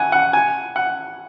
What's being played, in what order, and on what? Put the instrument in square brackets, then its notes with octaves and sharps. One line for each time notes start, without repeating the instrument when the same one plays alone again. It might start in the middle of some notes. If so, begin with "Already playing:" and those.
Already playing: [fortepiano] F#5 G#5
F#5
G#5
F#5